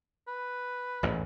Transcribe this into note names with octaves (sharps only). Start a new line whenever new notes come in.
B4
A1 E2 G#2